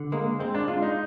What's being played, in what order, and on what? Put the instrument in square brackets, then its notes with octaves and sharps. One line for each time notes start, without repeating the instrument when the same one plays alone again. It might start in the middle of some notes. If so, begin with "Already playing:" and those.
Already playing: [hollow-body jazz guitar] D3
[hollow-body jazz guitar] G#3 [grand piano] A#3
[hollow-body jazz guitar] G#3 [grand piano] C4
[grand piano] D4
[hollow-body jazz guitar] G#3 [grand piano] F4
[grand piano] D#4